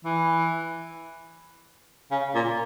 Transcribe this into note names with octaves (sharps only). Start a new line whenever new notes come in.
E3
C#3
A#2